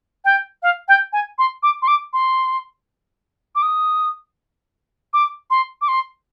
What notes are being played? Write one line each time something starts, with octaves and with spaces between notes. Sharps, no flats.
G5
F5
G5
G#5
C6
D6
C6
D6
C6
D6
D#6
D6
C6
D6
C6